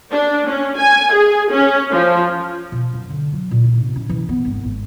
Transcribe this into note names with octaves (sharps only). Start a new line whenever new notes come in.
D4
C#4
G#5
G#4
C#4
F3
B2
F#2
D3
F#3
A#2
D#4
C3
C#4
E3
B3
G#1
G#1